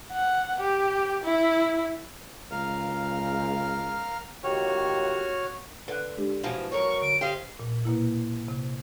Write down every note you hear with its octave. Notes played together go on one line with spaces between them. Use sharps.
F#5
G4
E4
C#2 A#4 F5 F6
C#2 D#3 F#4 G4 C#5 F6
D3 B4 F#5 F#6
G#3 D4 G4
B2 E3 F3
B2 F#3 A#4 C#5 C#6
D3 D7
G4 C5 D#5 F5
A#2
B2 A#3 E4
C3